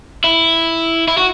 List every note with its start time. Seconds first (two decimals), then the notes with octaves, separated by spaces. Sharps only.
0.24 E4
1.08 E4
1.18 F#4